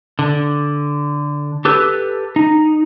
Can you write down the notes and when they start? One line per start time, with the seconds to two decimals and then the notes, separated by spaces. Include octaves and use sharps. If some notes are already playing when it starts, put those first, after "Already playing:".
0.19 D3
1.65 G4 A4 B4
2.36 D#4